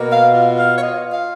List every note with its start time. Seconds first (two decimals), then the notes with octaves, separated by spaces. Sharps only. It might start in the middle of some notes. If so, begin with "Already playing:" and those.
Already playing: B2 A#3
0.11 F5
0.34 F4
0.58 F5
0.76 C#5
0.81 F4 D#5
1.12 F5